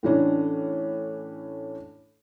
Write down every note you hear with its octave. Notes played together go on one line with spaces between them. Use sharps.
A2 E3 C#4 D4